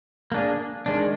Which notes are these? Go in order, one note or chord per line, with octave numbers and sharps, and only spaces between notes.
A#3 D4 G#4
D#3 G#3 D4